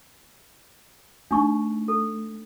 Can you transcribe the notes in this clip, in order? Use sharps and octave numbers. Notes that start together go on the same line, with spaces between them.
A3 D4 D#4 C#6
A4